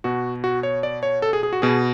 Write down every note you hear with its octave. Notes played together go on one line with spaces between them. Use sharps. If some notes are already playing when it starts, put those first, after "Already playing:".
B2 F#4
F#4
C#5
D5
C#5
A4
G#4
G#4
F#4
B2 G#4